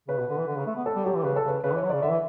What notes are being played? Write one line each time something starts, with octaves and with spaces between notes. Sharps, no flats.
C#3 B4
B2
D3
E3
D3
C#3
A3
B3
A4
G3
F#3 G4
E3
C#3 B4
A4
C#3 B4
C#3 B4
E3
C#5
F#3
C#3 D5
D3 E5
E3